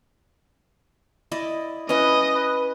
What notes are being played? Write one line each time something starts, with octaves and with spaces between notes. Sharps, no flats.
E4 D5 D#5
C#4 E4 B4 D#5
B4